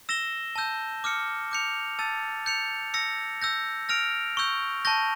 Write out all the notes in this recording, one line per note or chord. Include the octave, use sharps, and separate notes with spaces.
E6 A#6 E7 G7
A5 E6 G6
D6 F6 C#7
D6 G6 C#7 F7
A5 E6 A6
G6 C#7 F7
E6 A#6 C#7
E6 G6 A#6
F6 A#6 D7 F7
C#6 E6 G6
A5 C#6 G6 A#6